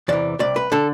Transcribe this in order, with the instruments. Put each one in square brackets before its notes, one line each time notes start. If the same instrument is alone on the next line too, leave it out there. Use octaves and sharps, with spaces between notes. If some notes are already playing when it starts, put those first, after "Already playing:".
[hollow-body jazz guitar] E2 C3 E3 D5
C2 C3 D5
B4
D3 A4